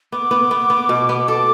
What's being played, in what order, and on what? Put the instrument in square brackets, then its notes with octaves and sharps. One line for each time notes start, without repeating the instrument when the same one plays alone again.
[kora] B3 [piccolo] D6
[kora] B3
B3
B3
B2
B3
[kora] A4 [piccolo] D6